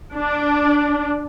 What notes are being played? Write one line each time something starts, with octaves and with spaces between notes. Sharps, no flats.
D4